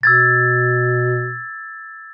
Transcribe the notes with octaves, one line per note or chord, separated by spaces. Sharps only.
B2 E6 G#6 A6